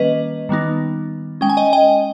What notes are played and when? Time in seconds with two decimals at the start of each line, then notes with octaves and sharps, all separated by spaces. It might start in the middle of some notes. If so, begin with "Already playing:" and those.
Already playing: D#3 G3 A#3 C#4 B4 D#5
0.49 D#3 G3 B3 D#4
1.41 G#3 C#4 G5
1.49 G#5
1.57 D#5 G5
1.73 D#5 G5